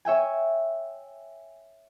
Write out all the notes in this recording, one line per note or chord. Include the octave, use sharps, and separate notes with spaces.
C#5 E5 G5 G#5